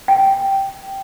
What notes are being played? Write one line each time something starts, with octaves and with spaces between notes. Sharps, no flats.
G5